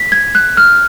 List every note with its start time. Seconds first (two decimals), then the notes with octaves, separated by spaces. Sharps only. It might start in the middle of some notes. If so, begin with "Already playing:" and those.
Already playing: B6
0.12 G#6
0.35 F#6
0.57 F6